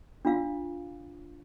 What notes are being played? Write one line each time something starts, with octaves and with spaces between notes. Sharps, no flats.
D4 F4 F5